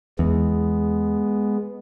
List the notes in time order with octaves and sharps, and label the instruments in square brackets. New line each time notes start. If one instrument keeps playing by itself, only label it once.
[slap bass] E2 [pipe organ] G#3 B3